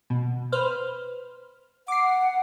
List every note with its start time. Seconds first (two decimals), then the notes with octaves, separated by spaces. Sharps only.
0.10 B2
0.52 B4 C5 F6
1.88 F#5 D6 C7